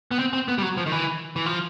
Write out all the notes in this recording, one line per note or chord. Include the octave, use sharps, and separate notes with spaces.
B3
C4
C4
B3
G3
F#3
F3
D#3
E3
E3
F3